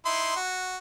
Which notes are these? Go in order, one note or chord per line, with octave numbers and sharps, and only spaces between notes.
D#4 E4 C6
F#4